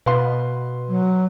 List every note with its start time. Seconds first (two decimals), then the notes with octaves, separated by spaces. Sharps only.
0.06 B2 B4 F5 C6
0.88 F#3